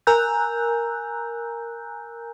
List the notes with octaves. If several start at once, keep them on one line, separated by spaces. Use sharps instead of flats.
A#4 G#5 A#5 E6 F#6 G6